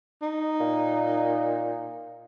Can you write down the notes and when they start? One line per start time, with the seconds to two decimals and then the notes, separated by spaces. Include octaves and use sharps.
0.22 D#4
0.60 A#2